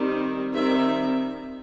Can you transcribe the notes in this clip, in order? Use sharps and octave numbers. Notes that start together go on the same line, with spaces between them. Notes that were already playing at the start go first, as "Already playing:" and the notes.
Already playing: D#3 G3 C4
D#3 G3 C4 E5